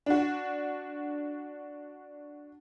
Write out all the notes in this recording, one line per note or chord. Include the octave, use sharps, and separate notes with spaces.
D4 F#4